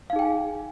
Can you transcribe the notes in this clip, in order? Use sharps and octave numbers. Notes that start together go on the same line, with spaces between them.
D#4 G#4 F5 G5 G#5